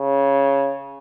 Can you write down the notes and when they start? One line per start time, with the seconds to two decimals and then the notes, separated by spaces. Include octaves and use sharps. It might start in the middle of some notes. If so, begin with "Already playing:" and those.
Already playing: C#3